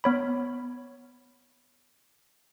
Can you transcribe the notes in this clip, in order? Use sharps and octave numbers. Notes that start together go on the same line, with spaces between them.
B3 C#5 B5